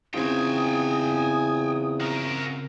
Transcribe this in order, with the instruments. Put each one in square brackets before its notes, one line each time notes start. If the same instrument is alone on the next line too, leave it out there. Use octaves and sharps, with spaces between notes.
[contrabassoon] E2 [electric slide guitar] C#3 C4 F4 [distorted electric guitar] G5 G#5 [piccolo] D#6
[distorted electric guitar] F#4 A#4